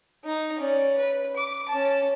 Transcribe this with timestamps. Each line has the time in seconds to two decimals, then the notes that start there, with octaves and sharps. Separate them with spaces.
0.24 D#4 A#5
0.59 C#4 D5
0.98 B4
1.36 D6
1.68 C#4 A5